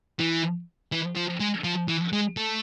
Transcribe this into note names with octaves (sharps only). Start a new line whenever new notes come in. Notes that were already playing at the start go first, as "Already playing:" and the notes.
E3
E3
F3
G#3
F3
E3
G#3
A3